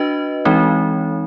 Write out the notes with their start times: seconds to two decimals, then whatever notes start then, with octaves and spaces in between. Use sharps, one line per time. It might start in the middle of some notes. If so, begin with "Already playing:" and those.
Already playing: D4 F#4 B4 D#5
0.45 E3 G#3 C4 D#4